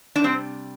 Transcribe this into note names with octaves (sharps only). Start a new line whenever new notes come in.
D4
C3 G3 C4